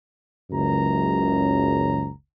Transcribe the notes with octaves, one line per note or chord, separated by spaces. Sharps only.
F#1 C#2 F#2 C#4 A#5